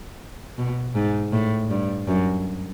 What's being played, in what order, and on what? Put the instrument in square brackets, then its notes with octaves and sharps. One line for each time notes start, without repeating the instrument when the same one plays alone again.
[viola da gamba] B2
G#2
A2
G2
F#2